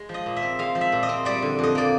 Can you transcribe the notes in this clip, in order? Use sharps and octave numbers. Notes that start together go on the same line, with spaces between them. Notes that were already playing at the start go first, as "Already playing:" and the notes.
Already playing: G#3
F3
D#5
A#2
E5
C4
G#3 F5
F3
E5
A#2
D#5
C4
G3 D5
D3
F2 D#5
A#3 D5